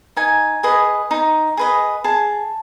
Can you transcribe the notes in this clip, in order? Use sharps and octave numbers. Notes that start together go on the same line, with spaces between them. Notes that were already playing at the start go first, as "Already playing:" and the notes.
D#4 G#5
G#4 B4 D#5
D#4
G#4 B4 D#5
G#4 A5